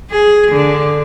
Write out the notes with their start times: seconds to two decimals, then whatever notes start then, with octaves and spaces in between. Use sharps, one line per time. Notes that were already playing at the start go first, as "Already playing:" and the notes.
0.11 G#4
0.52 D3